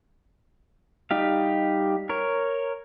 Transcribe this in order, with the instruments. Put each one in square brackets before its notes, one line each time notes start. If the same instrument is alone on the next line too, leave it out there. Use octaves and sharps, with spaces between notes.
[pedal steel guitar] G3 D#4 G4 F5
A#4 C#5